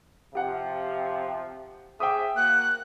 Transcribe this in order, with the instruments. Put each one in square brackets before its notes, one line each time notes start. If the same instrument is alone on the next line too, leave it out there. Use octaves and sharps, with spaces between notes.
[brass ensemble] C3 F3 [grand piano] G4 F#5
[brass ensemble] G#4 C5 E5 [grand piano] G5 D6 D#6
[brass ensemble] A#3 F#4 [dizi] F#6